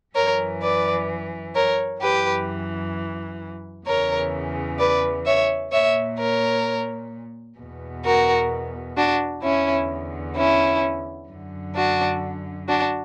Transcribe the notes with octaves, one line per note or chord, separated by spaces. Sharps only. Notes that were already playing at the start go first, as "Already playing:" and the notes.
F#2 E3 A#4 C#5
B4 D5
A#4 C#5
F#2 E3 G4 B4
E2 C#3 E3 A#4 C#5
B4 D5
C#5 E5
A#2 C#5 E5
A#4 C#5
E2 B2
F#4 A#4
D4 F#4
E2 D3 C#4 E4
C#4 E4
F#2 D3
D4 F#4
D4 F#4